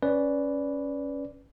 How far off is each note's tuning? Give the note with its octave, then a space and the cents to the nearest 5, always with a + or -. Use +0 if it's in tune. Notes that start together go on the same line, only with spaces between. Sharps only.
C#4 +0 B4 +0 D5 -10